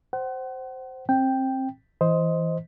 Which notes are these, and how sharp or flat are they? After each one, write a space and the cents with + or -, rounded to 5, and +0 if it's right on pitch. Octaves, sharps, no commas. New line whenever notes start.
C5 +0 F#5 +35
C4 +25 G5 +0
E3 -10 C5 +0 D#5 +15